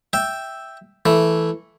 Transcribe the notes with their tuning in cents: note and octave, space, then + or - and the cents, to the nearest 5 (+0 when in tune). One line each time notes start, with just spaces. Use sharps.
E5 +0 G5 +0
E3 +0 A3 +0